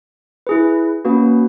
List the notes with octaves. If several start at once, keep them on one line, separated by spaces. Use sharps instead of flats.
E4 G#4 B4
A#3 C#4 F#4 B4